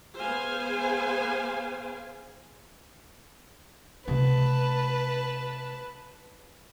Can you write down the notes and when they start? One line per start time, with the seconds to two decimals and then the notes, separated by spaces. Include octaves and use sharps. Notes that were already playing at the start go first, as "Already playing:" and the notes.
0.19 B3 G#4 C5 F5 G#5
4.08 C3 A3 B4 A5